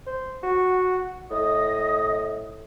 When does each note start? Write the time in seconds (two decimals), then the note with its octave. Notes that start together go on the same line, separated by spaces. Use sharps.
0.06 C5
0.43 F#4 F#5
1.31 A2 D#5 D#6